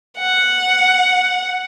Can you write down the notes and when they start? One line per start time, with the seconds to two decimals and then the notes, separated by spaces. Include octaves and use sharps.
0.19 F#5